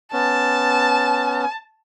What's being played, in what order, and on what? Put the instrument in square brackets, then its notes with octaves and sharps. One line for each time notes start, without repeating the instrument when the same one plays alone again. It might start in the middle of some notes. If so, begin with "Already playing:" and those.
[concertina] B3 C#4 [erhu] A5